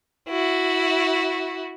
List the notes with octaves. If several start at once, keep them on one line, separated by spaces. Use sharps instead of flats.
E4 F#4